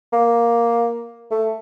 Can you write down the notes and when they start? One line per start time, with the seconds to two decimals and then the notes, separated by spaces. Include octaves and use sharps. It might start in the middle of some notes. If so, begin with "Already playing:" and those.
0.13 A#3
1.31 A3